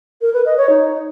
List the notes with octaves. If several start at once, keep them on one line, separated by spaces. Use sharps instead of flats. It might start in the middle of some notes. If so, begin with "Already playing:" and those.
A#4
B4
D#5
C#5
D#4